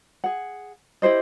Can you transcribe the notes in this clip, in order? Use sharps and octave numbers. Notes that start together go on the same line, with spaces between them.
G#4 F#5
E4 G4 C5 D#5